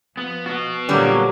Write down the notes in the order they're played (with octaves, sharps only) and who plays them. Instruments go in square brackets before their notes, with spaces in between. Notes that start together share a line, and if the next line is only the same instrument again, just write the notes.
[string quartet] F3 [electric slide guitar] B3
[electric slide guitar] B3 F#4
[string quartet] A#2 F#3 A#3 [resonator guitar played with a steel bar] D3 G3